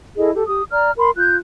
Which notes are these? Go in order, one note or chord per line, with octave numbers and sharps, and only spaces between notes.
E4 G#4 A4 D#5
G4 A4
G4 D#6
D5 A#5 F6
A#4 B5 C6
F4 F#6 G6